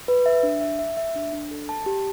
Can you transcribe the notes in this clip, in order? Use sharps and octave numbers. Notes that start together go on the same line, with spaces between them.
B4
E5
D4
E5
E5
E5
D4
D4
A4
A5
G4